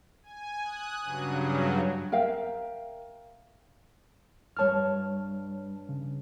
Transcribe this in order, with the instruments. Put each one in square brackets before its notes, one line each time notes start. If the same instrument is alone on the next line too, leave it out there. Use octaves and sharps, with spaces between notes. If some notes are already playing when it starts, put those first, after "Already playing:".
[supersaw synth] G#5
D#6 F#6
G2 C#3 F#3
[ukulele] A#4 E5 F5 G5
[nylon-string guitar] G2 C#5 [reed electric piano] G3 A5 F6
[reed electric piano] C#3